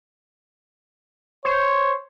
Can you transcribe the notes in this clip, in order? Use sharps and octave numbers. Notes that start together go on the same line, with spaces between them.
C5 C#5